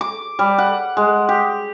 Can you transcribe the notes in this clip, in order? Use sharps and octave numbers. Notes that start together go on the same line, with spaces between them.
D6
G3
F#5
G#3
G4